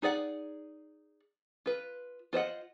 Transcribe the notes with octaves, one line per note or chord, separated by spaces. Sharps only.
D#4 G#4 D5 F#5
F4 B4
F4 C5 D#5 F#5